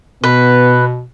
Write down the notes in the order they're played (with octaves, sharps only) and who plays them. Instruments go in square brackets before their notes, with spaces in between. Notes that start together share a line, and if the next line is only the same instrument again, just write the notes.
[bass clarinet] B2 [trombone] B3 [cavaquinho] B4